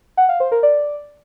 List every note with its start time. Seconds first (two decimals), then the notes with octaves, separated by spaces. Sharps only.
0.17 F#5
0.29 F5
0.40 C5
0.52 A#4
0.63 D5